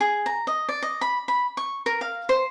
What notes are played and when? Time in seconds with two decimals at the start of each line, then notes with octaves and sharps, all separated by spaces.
0.01 G#4
0.26 A#5
0.47 D#5
0.69 D5
0.83 D#5
1.01 B5
1.28 B5
1.57 C#6
1.86 A#4
2.01 F5
2.29 C5